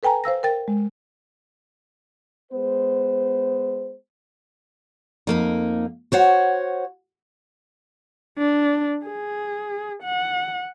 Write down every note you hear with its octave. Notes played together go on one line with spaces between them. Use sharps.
A4 B4 G5 G#5 A#5
C5 F5 E6 A#6
A#4 G5 A6
G#3
G#3 B3 C5
F2 A#3 D#4
F#4 C5 C#5 F#5
D4
G#4
F#5